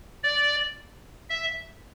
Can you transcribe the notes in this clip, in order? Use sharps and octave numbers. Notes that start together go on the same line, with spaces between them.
D5
E5